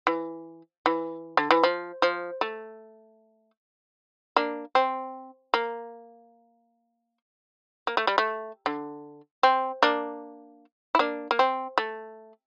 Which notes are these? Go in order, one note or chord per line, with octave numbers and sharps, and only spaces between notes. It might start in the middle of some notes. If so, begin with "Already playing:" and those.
E3
E3
D3
E3
F3
F3
A3
A#3 D4
C4
A#3
A#3
A3
G3
A3
D3
C4
A#3 D4
E4
A#3 D4
A#3
C4
A3